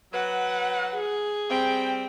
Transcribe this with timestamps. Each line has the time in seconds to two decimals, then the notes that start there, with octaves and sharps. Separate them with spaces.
0.13 F#3 B4 F#5
0.94 G#4
1.50 G3 C4 G5